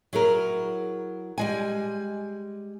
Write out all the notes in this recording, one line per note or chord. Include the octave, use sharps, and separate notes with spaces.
F#3 E4 G#4 A#4
G3 G#3 G#5